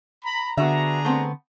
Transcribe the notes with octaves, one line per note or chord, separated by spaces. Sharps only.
A#5 B5
D3 B3 D4 F#4 G#4 E5 A#5
A3 B3 C4